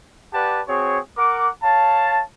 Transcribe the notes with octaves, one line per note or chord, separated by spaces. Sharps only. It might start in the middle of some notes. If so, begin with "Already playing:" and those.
G4 B4 D5 F#5 A5
C4 F#4 G#4 C#5
A#4 F#5 D6
C#5 F5 A5